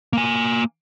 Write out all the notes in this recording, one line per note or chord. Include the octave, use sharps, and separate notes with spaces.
A#3 G#5